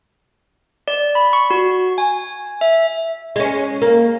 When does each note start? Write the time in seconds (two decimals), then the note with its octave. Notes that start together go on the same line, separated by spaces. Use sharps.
0.88 D5
1.15 B5
1.33 C#6
1.51 F#4
1.98 G#5
2.61 E5
3.36 G#3 C#4
3.82 A#3